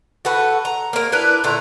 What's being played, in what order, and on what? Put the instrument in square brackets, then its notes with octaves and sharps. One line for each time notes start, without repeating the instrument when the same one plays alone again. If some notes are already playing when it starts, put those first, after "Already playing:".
[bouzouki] F#4 A4 B4
A#5
A#3 A#4
D4 E4 A#4 B4
A#2 D3 A3 A#5